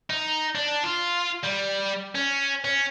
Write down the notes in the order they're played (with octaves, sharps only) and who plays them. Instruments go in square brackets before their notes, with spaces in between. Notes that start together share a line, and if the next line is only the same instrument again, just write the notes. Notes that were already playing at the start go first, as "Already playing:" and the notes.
[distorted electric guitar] D#4
D4
F4
G3
C#4
C#4